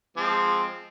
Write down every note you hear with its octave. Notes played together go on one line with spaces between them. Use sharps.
F3 G#3 C4